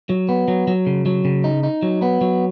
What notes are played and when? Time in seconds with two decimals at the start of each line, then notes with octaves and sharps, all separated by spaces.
0.10 F#3
0.29 B3
0.48 F#3
0.68 F#3
0.87 C#3
1.06 F#3
1.25 C#3
1.44 D#4
1.63 D#4
1.83 F#3
2.02 B3
2.21 F#3